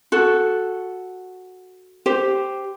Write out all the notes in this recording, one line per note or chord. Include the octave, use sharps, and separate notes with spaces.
F#4 A4
G4 C5